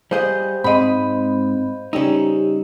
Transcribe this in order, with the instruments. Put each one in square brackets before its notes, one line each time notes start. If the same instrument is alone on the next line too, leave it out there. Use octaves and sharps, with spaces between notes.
[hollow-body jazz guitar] G3 G#4 D#5 [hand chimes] C5 F5 G6
[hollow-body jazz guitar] G#2 G#3 [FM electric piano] C4 [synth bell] D#5 B5
[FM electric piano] C#3 G3 E6 [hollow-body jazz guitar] C#4 D#4